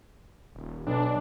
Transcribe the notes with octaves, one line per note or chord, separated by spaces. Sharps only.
D#1
B1 D4